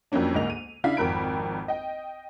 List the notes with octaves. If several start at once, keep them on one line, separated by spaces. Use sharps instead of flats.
F2 F#3 A#3 C#4 D4
D2 G#2 A#3 D#5 F7
D#7
C#3 D4 E4 F5 B6
G#1 F2 A#4 B5 D7
D#5 G5